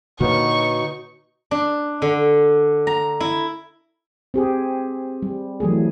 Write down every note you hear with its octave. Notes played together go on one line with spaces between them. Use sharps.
A#2 D3 A#3 D#4 F#4 B4 C#5 C#6
D4
D3
A#5
E4
C4 G4 G#4
G3
E3 F#3 A3 G#4